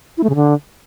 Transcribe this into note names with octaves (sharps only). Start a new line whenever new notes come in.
E4
A3
C#3
D3